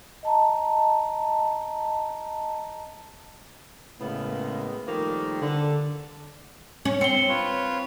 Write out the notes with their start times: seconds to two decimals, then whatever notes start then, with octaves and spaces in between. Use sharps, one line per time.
0.23 D#5 A5 A#5
4.00 A2 C#3 G#3 A#3 B3
4.87 D#3 F3 G3 A3 A#3
5.41 D3
6.85 C#4
7.01 C4 C#7 G7
7.29 F4 B4 C#5